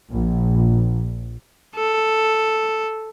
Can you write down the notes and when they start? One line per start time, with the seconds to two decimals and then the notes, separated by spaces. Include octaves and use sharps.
0.10 A#1
1.76 A4